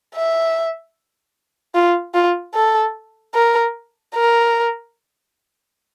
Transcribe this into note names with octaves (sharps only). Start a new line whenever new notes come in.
E5
F4
F4
A4
A#4
A#4